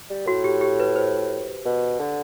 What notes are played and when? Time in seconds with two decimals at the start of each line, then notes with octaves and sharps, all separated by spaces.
0.10 G3
0.27 A2 F#4
0.44 G4
0.61 G4
0.80 B4
0.96 C5
1.65 B2
2.00 D3